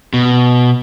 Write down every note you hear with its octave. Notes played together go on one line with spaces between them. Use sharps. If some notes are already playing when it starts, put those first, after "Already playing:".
B2